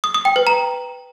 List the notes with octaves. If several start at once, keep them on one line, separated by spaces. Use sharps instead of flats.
D#6
D#6
G5
B4
A#5